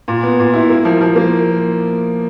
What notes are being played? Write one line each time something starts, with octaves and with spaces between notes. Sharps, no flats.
A#2
B3
A#2
E4
A#3
F3
F3
A#3